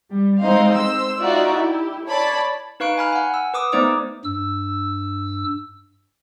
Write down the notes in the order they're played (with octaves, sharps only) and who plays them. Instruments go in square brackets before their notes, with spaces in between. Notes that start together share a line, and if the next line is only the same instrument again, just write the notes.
[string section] G3
G#3 C4 D#4 C5 D#5 F5
C5 E6
D#4 F4 F#4 D5 E5
E4 G4
C#5 D5 A5 B5
[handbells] D#4 B4 F5 C#6 F#6 D7
G#5 B5 F6 F#6
F#5 G#5
E6
B4 D6 D#6
A3 B3 D#4 C5 D5 D6
[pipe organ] G2 E6